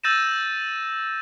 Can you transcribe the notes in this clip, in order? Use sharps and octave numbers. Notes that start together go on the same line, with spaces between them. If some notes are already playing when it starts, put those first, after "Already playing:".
E6 G6 A6 A#6 D#7 E7